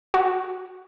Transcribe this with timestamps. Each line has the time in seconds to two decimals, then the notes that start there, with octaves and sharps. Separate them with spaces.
0.14 F#4